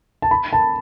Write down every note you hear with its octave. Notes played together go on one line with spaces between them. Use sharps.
A5
B5
A5